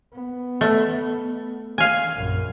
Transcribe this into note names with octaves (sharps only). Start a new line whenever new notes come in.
B3
A3
F5 G#5
A#1 F#2